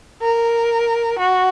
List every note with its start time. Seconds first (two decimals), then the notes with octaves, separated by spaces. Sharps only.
0.22 A#4
1.19 F#4